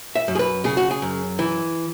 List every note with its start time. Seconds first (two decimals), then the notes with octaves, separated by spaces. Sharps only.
0.16 E5
0.28 F#2
0.35 G#4
0.39 B4
0.64 C#3 G#4
0.77 F#4
0.91 G#4
1.02 F#2
1.39 E3